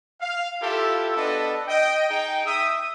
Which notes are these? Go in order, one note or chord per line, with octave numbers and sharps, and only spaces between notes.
F5
E4 F4 G4 A4 E5
B3 D4 A4 B4 D#5
D#5 G5
D#4 G#4 G5
E5 D#6